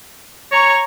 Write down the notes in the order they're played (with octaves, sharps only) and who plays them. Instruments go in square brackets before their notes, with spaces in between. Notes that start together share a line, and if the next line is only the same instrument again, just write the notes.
[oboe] C#5 [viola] A#5 C#6